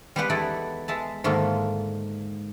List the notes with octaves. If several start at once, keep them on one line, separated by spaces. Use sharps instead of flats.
G3 G#3 B3 G4 B4 F#5
E2 D#4 E4 A4 D5
G#3 E5 A5
G#2 D3 D#3 A3 A#3 F4